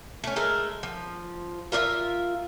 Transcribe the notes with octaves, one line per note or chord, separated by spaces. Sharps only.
A3 C#4
G#3 A3 A#4
F3
F4 A#4 D#5 E5